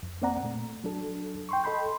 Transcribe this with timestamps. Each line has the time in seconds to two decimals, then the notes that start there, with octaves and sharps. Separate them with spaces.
0.03 F2
0.22 A#3 C4 D5 F#5 A#5
0.43 A#2 A3
0.84 F#3 D4 A4
1.49 G5 C6 C#6
1.64 A4 D#5 B5 C6 G6